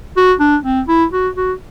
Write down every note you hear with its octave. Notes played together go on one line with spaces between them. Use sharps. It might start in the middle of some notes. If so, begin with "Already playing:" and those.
F#4
D4
C4
E4
F#4
F#4